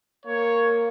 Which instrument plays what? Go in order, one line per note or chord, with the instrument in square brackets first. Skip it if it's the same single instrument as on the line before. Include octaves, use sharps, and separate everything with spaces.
[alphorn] A#3 [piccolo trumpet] C#5